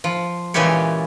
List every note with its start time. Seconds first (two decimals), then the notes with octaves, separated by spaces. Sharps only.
0.04 F3
0.54 A#2 C#3 E3 G#3 G4 C#5